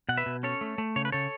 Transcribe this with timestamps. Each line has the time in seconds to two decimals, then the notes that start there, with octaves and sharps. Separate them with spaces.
0.09 B2 F#5
0.17 B4 E5
0.26 B2
0.43 C#4 A4 C#5
0.61 A3
0.78 A3
0.96 C#3 C#5
1.05 B4
1.12 C#3 A4 C#5